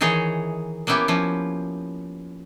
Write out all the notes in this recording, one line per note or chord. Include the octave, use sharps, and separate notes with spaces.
D#3 E3 D#4 G#4 C#5 D#5
A#3 B3 C#4 E4 G4
F3 C#4 E4